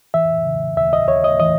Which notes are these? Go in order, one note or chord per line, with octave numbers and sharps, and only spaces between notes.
E3 E5
C#3
D#2 E5
D#5
D#2 C#5
D#5
E3 D#5